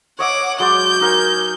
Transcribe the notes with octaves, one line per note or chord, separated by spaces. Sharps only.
C#5 D#5 E5 F#5 D6
F#3 G#3 D5 G6
D#4 A#4 G#5